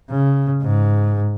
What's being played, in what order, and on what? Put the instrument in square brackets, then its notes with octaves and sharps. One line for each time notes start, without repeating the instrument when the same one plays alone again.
[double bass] C#3
G#2